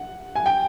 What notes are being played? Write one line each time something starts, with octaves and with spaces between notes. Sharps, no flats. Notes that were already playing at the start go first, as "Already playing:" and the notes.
Already playing: F#5
G#5
G5